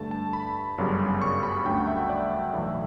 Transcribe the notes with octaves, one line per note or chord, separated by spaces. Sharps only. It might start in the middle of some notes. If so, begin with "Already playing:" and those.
Already playing: G2 D3 A3 A5
A5
B5
G1 F#2 C#3 G3
C#6
B5
D2 D3 A3 G5
F#5
E5
F#5
D5
B1 A2 E3 E5